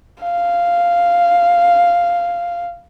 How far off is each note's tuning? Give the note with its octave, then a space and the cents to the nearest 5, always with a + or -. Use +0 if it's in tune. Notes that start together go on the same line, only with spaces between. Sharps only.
F5 -5